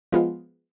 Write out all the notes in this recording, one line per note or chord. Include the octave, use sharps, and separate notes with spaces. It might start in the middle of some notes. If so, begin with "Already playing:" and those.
F3 G#3 B3 F4